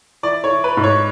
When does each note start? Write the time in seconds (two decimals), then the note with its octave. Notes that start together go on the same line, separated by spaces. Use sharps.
0.23 E3 D5
0.44 C#5
0.51 E3
0.64 B4
0.77 G#2
0.84 C#5